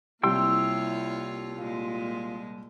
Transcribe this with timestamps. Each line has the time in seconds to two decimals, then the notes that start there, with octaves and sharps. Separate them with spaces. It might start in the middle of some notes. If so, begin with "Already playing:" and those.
0.23 C2 A#3 E4 F4 C#5 G5 C6 E6
1.59 A#2 G#3 F4